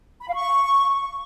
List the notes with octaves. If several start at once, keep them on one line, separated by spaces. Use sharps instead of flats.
B5
F5
C#6